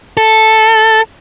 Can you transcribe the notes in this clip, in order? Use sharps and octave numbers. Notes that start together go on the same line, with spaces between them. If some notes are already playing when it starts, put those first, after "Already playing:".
A4